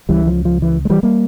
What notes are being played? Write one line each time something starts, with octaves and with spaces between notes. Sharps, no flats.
C#2 C#3 E3 G3
F3
F3
E3
G#3
E3 G3
G3 A#3